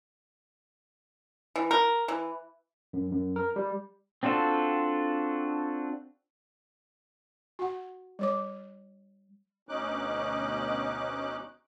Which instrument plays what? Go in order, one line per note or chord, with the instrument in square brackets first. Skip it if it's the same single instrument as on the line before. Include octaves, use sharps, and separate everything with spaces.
[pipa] E3
A#4
E3
[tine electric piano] F#2
F#2
A#4
G3
[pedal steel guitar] C4 D4 F4 F#4 A4
[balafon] F#4 F#5
G3 C#5 D6
[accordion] D2 B2 C#4 D#4 D6 F#6